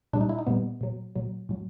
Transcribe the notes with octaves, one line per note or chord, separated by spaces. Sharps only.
A#2 G3 D4
D#4
E4
D#4
A#2 G3 B3
A#2 F#3
A#2 F#3
A2 F#3